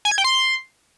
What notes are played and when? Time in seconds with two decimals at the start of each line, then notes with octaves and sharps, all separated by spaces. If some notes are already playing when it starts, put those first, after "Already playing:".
0.05 G#5
0.11 G#6
0.18 G5
0.24 C6